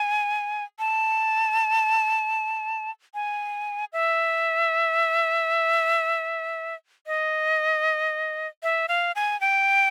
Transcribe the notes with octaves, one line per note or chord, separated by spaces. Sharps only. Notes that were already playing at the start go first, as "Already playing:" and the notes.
Already playing: G#5
A5
G#5
E5
D#5
E5
F5
G#5
G5